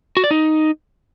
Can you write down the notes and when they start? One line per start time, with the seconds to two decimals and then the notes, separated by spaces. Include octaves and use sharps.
0.17 F#4
0.24 D5
0.31 D#4